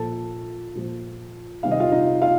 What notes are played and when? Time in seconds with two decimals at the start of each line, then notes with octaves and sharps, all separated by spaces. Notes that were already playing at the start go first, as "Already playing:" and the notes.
Already playing: A#2 F3 A4 A5
0.75 A#2 F3
1.63 C3 D#3 G3 F5
1.71 D#5
1.80 F4 F5
1.92 D#4 D#5
2.22 F4 F5